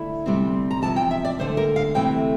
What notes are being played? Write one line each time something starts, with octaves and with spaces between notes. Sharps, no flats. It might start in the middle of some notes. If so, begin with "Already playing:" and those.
Already playing: D3 A3 E4
D2 C3 G3 C4
A#5
E2 C3 F3 A5
G5
E5
D5
D2 D3 A3 C5
A#4
F5
D2 C3 E3 A3 C4 G5